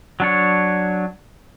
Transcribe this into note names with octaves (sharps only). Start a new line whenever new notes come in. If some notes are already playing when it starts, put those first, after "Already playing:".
F#3 D4 C#5